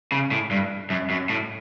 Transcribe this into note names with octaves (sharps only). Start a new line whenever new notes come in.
C#3
A2
G2
F#2
F#2
A2